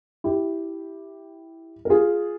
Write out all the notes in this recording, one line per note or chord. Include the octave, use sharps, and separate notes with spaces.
E4 G4
A#4
F4 G#4